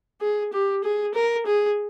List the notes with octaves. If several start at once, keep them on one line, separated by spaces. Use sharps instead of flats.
G#4
G4
G#4
A#4
G#4